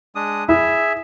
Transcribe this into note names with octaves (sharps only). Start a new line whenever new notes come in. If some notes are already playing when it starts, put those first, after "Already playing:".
G#3 D4 D#6
E4 G#4 E5